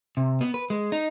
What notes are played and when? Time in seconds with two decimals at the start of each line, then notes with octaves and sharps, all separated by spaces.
0.17 C3
0.41 B3
0.54 B4
0.70 G#3
0.92 D#4